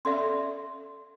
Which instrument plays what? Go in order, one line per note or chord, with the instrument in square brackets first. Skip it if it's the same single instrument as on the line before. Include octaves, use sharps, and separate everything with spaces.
[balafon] C#4 A4 D5 [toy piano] E5 C6